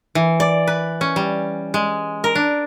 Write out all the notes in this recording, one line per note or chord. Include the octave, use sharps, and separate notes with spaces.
E3
D5
B4
C#4
G3
G#3
A#4
D4